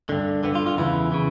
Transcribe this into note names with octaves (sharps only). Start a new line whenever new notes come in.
G2 D3
G2 D3 B3
F4
F4
E2 C#3 E3 E4
C#3 E3